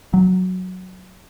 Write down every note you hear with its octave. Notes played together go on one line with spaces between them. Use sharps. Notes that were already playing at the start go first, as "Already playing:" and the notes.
F#3